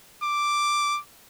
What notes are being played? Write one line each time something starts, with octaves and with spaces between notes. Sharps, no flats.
D6